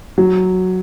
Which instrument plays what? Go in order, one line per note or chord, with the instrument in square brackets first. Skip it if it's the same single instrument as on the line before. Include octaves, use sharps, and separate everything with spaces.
[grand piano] F#3